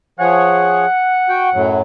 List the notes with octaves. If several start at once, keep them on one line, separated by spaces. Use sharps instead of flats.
F3 G#4 C#5 F#5
F#4 G5
F#2 A2 F#3